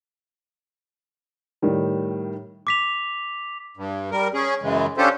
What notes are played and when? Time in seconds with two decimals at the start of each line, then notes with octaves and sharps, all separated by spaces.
1.62 A2 D#3 G3
2.67 D6 B6 F7
3.77 G2
4.11 G3 A#4
4.34 C#4 G#4
4.62 F#2 C#3 E3 G#3
4.98 C#4 D4 F4 G4 A4 C5